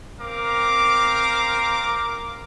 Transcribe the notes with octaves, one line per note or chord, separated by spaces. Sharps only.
C4 A#4 F5 D6